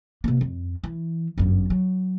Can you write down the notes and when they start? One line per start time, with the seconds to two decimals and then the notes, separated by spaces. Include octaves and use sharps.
0.24 C3 A#3
0.41 F2
0.84 E3
1.38 G1 F#2
1.70 F#3